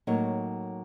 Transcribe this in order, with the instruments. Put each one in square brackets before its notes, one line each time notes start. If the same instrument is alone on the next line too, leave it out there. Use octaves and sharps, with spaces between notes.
[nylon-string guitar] A2 F#3 A#3 D#4 C#5